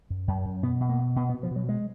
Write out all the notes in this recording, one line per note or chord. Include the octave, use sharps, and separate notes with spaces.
F#2
F#2
F#2
B2 B3
B2
A#3
B2
B2 B3
B3
B2
F3
B2 F#3
G#3